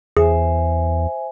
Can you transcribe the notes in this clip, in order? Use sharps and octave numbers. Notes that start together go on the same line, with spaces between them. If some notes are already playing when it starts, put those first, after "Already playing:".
E2 G#4 C5 E5 G#5